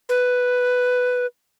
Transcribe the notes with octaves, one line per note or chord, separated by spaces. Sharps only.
B4